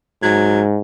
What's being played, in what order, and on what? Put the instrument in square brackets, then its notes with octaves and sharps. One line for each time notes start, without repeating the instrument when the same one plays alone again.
[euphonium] G#2 [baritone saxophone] F#3